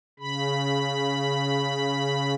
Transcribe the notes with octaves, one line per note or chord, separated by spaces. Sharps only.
C#3 B5